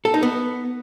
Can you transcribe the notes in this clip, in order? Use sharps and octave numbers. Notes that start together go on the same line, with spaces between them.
A4
D#4
B3